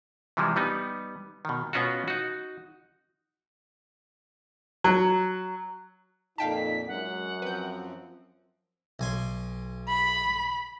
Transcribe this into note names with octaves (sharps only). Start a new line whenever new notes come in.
C3 E3 F3 G3 G#3
G3 B3 D#4
B2 D#3
B2 B3 C#4 F4 F#4
D#4 F#4
F#3
F2 A#2 D#4 F5 G5 A5 B6
F#2 G#3 F#5
F3 C4 B4 G6
B1 G#5 C6
B5